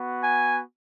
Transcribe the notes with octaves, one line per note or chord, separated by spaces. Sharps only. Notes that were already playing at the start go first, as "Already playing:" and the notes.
Already playing: B3 F#4
G#5